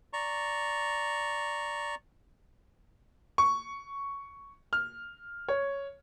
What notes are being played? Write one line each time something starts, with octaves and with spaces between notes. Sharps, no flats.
D5 A#5 C#6
C#6
F6
C#5